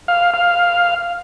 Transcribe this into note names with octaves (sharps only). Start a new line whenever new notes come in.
F5
F5